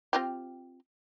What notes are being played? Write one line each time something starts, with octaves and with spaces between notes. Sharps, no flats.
C4 F4 G4